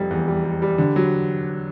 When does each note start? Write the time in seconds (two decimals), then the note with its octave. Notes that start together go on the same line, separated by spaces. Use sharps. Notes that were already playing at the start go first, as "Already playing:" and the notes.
Already playing: F1 G3
0.11 E2
0.28 G3
0.45 G3
0.62 G3
0.78 D3
0.96 F#3